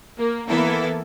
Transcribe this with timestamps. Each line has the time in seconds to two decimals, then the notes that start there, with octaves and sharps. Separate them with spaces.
0.18 A#3
0.48 E3 A#3 B3 E4 A4